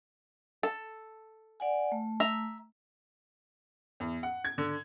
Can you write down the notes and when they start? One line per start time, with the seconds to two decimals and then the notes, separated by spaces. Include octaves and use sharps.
0.63 A4
1.60 D5 F#5 G#5
1.92 A3
2.20 E5 A#5
4.00 E2
4.23 F#5
4.45 G#6
4.58 D3